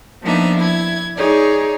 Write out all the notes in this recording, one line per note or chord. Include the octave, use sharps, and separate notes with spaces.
F3 A#3 B3 D4 D#4 E5
E4 G#6
D#4 G#4 C#5 D5